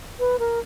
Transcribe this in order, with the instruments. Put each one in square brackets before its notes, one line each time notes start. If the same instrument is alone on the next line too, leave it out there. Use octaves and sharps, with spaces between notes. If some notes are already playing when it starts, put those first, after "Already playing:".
[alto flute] B4
A#4